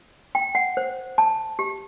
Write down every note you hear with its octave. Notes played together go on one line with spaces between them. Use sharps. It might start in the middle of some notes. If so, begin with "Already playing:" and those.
G5
F#5
C5
A5
G4